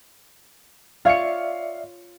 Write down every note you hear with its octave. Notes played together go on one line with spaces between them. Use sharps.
F4 C#5 D5 E5 F5 C#7